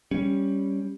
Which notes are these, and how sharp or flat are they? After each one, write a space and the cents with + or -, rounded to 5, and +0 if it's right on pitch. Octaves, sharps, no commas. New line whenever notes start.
G3 +0 C#4 -5